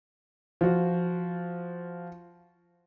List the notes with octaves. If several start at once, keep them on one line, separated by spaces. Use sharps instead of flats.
F3 F#4